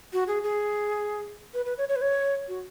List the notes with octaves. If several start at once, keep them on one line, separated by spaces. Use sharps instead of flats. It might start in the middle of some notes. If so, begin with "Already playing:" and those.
F#4
G#4
G#4
B4
B4
C#5
C#5
B4
C#5
F#4